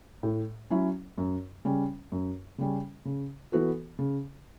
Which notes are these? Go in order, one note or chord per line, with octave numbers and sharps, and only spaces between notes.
A2
F#3 C#4 E4
F#2
C#3 G3 C#4
F#2
C#3 G3 C#4
C#3
E3 B3 F#4 A4
C#3